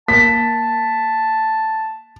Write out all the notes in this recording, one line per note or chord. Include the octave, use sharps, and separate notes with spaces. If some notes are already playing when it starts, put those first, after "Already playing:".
A#3 A5 B6